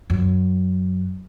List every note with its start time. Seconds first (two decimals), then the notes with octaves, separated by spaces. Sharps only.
0.10 F#2